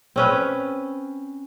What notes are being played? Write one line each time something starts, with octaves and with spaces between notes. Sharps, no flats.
C4 C#4 B4